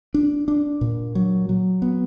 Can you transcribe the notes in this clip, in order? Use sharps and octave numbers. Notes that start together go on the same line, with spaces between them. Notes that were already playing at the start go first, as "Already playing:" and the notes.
D4
D4
A#2
F#3
F#3
B3